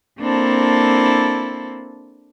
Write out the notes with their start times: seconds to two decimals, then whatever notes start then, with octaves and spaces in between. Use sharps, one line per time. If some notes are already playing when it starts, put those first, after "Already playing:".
0.20 A#3 C4 D4 E4 A4